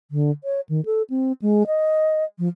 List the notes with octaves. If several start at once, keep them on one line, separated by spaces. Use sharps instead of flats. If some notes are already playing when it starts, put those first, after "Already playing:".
D3
C#5
D#3
A4
C4
G#3
D#5
F3